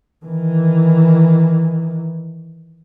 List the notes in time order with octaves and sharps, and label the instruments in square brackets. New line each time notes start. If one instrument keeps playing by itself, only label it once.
[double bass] D#3 E3